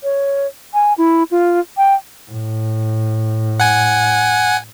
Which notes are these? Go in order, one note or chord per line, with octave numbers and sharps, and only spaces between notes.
C#5
G#5
E4
F4
G5
A2
F#5 G#5